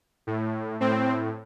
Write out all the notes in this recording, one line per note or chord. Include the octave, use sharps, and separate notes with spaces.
A2
A2 C4